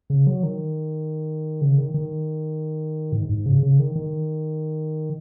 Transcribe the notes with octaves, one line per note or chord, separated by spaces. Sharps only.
C#3
F#3
D#3
C#3
D#3
D#3
G#2
G#2
C#3
C#3
D#3
D#3